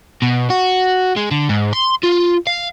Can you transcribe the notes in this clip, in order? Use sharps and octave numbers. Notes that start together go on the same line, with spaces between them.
B2
F#4
G#3
D3
G#2
C6
F4
F5